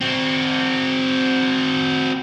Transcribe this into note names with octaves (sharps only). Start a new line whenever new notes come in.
C4 F#4